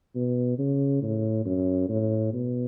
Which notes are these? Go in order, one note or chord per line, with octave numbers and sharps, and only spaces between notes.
B2
C#3
A2
F#2
A2
B2